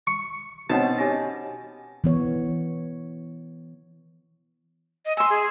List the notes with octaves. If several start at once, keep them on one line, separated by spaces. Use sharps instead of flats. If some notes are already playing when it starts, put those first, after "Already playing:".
C#6
B2 C4 C#4 D#4 B4 C5 F#5 A5
C#4 G4 D#5 G#5 A#6
E3 B3 C#5
D#5
G#5 C6 E6
G#4